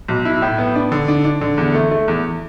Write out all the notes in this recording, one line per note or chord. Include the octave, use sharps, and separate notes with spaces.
B1
E4
A2
B3
D4
D3
D4
D4
D3
E2
A3
A3
E2